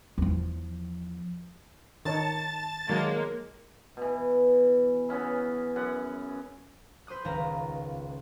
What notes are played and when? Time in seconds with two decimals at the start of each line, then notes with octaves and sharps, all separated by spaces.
0.18 E2 F3
2.05 D#3 D#4 C#5 A5 A6
2.89 D#3 F#3 G#3 A#3
3.97 B2 E3
5.09 C#3 B3 C#4 E4
5.76 F#2 F#5
7.07 B4 C5 C6 D#6 F#6
7.25 D#1 C#2 A#3 B4 A#5 A#6